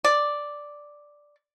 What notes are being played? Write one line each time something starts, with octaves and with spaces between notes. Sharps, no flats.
D5